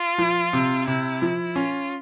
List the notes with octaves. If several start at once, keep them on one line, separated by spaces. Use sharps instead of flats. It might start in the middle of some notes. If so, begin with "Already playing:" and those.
Already playing: F4
F3
C3
C3 E4
F3
C#4 F4